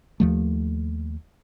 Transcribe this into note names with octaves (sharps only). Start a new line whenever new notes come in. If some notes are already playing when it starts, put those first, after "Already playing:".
D#2 F3 A3